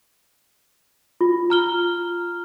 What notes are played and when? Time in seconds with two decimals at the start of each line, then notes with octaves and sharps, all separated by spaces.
1.21 F4
1.50 A#5 F6 G7